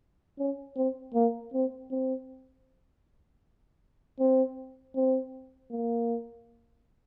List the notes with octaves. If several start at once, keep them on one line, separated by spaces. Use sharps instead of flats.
C#4
C4
A#3
C4
C4
C4
C4
A#3